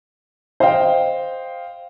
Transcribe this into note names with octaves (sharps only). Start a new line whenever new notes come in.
C5 D#5 F5 G5